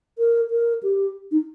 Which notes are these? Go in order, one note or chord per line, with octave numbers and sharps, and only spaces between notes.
A#4
A#4
G4
D#4